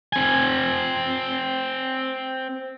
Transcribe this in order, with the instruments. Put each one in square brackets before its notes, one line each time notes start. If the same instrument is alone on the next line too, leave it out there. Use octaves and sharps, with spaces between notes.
[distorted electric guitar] C4 G#5